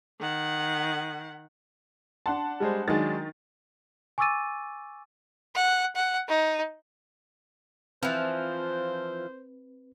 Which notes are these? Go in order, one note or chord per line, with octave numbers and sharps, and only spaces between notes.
D#3 F#5
D4 F#5 A5 C6
G3 G#3 C5
D#3 F#3 G#3 D4 A6
G#5 C#6 D6 E6 A6 D#7
F#5
F#5
D#4
E3 F3 C4 B4 C5